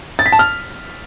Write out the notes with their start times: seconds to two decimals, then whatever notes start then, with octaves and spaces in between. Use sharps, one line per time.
0.19 A6
0.26 B6
0.32 A5
0.39 F6